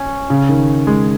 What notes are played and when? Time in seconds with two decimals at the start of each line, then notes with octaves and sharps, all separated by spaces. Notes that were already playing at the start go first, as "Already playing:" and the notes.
Already playing: C#4 C#5
0.30 C#3
0.49 D#3
0.87 G#3